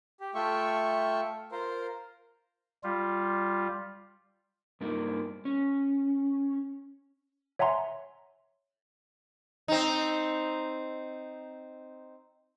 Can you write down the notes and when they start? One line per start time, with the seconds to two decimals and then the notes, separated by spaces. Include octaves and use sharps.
0.20 G4
0.35 A3 F4 E5 G5 C#6
1.52 F4 A#4 C5
2.83 G3 F4
4.81 G2 A#3 D#4
5.45 C#4
7.59 C#5 E5 F#5 G#5 A#5 C6
9.68 C4 D#4